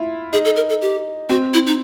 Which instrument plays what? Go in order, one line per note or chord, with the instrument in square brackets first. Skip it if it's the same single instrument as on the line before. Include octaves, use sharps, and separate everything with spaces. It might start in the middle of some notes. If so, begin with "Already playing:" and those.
Already playing: [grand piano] E4 F4
[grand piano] D#4 [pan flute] G#4
[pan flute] A4
A#4
A4
G4
[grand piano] C4 [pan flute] F#4
[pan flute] E4
D#4